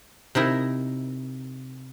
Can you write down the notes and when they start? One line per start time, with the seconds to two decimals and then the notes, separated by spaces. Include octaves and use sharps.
0.35 C3 D#4 E4 A#4